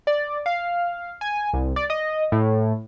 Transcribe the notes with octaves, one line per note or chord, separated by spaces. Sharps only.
D5
F5
G#5
C2
D5
D#5
A2